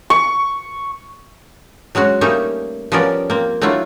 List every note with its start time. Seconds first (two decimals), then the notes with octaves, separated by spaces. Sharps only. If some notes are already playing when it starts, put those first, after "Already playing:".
0.10 C#6
1.95 F#3 G#3 C#4 F#4
2.21 G3 A3 A#3 C#4 D#4 G4
2.92 F3 G3 B3 C#4 A#4 D5
3.30 A#3 C4
3.61 F#3 A3 D4 E4 F4